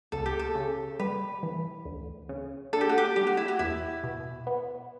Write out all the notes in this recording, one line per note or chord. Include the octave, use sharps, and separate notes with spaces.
C#2 A4
G4
A4
C#3
G3 B4
E3
D2
C#3
D4 A4
G4
F#4
G4
G3 G4
F#4
E4
F#4
E2 E4
B2
B3